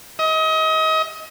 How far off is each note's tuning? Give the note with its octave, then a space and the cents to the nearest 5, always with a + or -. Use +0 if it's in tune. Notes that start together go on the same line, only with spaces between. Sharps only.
D#5 +30